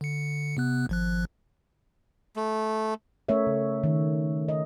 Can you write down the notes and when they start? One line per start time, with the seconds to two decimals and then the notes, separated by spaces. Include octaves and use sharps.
0.01 D3 C#7
0.57 C3 B3 F#6
0.89 G#1 F3 F#6
2.36 A3
3.29 A3 C#4 A#4 C#5 E5
3.47 C#3
3.84 D#3
4.49 D#5